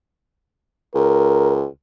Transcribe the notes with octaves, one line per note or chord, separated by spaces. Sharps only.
C#2 A#4